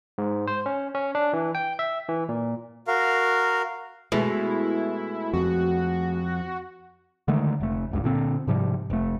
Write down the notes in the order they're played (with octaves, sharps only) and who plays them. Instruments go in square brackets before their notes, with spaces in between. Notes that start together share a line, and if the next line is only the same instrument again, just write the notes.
[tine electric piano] G#2
C5
C#4
C#4
D4
E3
G5
E5
E3
A#2
[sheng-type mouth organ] F#4 A#4 F5
[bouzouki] B2 [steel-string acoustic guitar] G#3 A3 [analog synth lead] E4
[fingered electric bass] F2 [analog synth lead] F#4
[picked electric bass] D3 D#3 G#3 A3
F1 A3
F#1 C#2 G2
A#2 D3 C4
G#2 C3 F3 G3
F1 A3